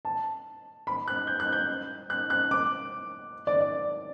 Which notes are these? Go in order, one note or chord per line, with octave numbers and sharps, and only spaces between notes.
A5
B5
F#6
G6
F#6
G6
F#6
F#6
D6
D5
D5